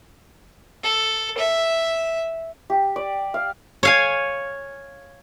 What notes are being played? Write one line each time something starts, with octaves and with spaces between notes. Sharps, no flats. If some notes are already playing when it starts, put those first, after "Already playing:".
A4
E5
G4
D5
F5
C#5 F5 G#5